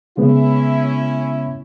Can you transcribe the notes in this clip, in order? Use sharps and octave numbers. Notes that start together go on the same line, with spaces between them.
C#3 G#3 B3 C#4 E4